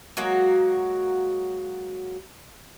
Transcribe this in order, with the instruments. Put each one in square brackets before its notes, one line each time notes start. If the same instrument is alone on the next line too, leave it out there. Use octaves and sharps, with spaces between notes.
[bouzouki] F#3 G#3 A#3 F#4